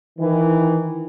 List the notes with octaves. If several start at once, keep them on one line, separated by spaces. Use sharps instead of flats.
D#3 E3